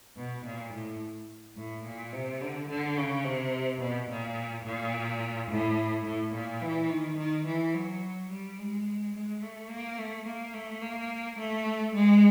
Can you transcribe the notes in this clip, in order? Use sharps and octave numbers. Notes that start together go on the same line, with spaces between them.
B2
A#2
A2
A2
A#2
C3
D3
D3
C#3
C3
B2
A#2
A#2
A2
A2
A#2
E3
D#3
D#3
E3
F#3
G3
G#3
G#3
A3
A#3
A3
A#3
A3
A#3
A3
G#3